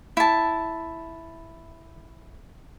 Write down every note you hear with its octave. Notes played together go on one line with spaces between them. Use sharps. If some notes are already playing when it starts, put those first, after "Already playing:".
E4 A5